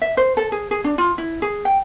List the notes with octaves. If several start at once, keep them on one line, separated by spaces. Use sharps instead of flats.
E5
C5
A4
G#4
G#4
D4
F4
E4
G#4
G5